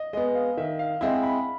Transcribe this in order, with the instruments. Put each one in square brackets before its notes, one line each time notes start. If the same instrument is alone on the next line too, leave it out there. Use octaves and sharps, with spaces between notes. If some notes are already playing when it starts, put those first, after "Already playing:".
Already playing: [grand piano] D#5
[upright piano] G#3 B3 [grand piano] D#5
[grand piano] F5
[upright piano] D#3 [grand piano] E5
[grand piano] F5
[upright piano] G#3 C4 E4 [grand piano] F#5
[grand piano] B5